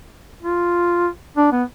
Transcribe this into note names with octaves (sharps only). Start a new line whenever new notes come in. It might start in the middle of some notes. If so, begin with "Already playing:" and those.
F4
D4
B3